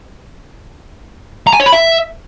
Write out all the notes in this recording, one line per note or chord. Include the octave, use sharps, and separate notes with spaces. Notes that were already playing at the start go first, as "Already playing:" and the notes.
A#5
G#5
C#5
B5
E5